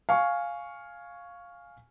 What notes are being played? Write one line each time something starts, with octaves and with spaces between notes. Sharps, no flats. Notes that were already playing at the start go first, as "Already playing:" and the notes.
F5 G#5 C#6